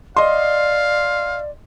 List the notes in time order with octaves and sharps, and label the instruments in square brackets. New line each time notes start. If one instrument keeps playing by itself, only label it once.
[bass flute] D5 [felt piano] D#5 C6 [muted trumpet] F5